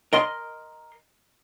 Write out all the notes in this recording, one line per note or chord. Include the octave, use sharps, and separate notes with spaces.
A#4 D#5 C6